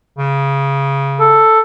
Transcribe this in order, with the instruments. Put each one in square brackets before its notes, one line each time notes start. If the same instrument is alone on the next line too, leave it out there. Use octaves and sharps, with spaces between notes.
[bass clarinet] C#3
[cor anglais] A4